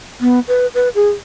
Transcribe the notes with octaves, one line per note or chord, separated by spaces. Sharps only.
B3
B4
B4
G#4